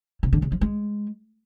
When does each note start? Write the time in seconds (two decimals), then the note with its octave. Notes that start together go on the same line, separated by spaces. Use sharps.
0.23 C3
0.33 D3
0.42 C#3
0.52 F3
0.61 G#3